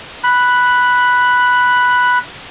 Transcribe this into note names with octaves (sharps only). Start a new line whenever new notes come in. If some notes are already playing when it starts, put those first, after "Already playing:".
B5 F#6